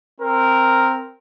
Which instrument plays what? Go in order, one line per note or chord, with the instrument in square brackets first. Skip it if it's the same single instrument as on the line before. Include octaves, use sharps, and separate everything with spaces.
[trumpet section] C4 A#4